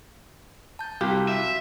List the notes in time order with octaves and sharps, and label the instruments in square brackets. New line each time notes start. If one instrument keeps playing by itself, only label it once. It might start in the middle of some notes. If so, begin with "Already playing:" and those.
[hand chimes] A5 G6
[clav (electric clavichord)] C2 G4 [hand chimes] F#4 F5
[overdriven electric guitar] E5